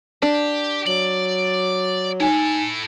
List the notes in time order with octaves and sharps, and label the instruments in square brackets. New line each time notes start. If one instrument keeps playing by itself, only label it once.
[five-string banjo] D4 [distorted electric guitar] G4
[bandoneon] F#3 [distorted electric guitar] D5 [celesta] F#7
[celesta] D#4 G#5 [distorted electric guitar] E4 A4